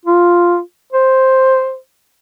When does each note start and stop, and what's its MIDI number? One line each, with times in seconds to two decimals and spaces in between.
0.06 0.60 65
0.93 1.77 72